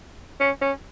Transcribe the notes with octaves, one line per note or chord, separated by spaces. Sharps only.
C#4
C#4